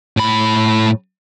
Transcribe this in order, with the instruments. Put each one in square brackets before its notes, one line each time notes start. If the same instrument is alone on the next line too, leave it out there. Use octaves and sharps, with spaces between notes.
[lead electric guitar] A2 B5